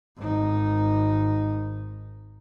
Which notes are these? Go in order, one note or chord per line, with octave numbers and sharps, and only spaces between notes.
G#1 D#4